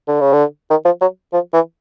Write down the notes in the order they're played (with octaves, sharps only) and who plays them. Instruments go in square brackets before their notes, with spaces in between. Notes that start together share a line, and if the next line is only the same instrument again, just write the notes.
[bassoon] D3
C#3
D3
D#3
F3
F#3
F3
E3